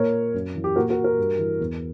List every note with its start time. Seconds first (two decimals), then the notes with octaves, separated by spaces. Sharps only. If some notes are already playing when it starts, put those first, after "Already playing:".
Already playing: A#2 A#4 C#5
0.34 F#2
0.55 E3
0.64 G4
0.76 A#2 F#4 A#4
0.90 F#4 A#4
1.04 F#4 A#4
1.18 G2
1.39 E3
1.60 E2